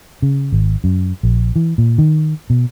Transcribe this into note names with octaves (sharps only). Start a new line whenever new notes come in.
C#3
G#1
F#2
A#1
E3
A#2
D#3
B2